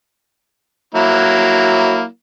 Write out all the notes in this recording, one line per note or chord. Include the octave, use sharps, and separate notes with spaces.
F#3 A#3 E4